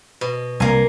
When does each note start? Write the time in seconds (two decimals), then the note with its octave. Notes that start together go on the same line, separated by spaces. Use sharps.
0.21 B2
0.60 C2 A#3 G#5